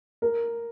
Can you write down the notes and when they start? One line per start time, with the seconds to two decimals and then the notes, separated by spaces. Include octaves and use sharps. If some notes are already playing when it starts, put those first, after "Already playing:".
0.22 A#4